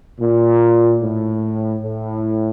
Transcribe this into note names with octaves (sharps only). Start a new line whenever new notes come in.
A#2
A2
A2